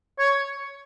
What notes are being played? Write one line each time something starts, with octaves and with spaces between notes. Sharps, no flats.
C#5